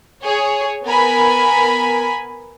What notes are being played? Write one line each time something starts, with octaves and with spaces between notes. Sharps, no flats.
G#4 C#5
B3 A#4 G#5 B5